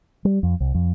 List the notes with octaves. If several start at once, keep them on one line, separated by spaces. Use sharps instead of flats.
G3
F2
C2
F2